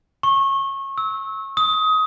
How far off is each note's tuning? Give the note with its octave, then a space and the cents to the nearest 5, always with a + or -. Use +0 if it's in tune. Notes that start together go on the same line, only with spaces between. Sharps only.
C#6 -25
E6 -25
D#6 +20